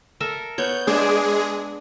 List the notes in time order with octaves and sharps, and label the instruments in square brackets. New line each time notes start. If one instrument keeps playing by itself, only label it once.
[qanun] A4 A#4 E5
[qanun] B3 C#5 [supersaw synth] G6
[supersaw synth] G#3 G#4 [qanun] D4 D5